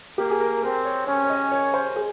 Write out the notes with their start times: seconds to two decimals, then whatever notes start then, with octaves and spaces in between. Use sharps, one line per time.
0.18 A#3 G4
0.30 G#4
0.40 A#4
0.63 C4 A#4
0.85 C#5
1.07 C#4 C#5
1.24 C#5
1.30 D#5
1.52 C#5
1.74 C5
1.96 G#4